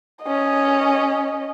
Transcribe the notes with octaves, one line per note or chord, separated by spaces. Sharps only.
C#4 D#5